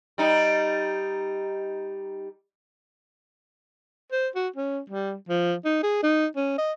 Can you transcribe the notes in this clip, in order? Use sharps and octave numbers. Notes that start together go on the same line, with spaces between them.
G3 D#4
C5
F#4
C#4
G3
F3
D#4
G#4
D#4
C#4
D#5